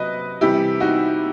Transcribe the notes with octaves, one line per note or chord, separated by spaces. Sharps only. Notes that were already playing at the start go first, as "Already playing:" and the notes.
Already playing: C3 F#3 B4 D#5
C3 E3 G3 E4 G4
D#4 F#4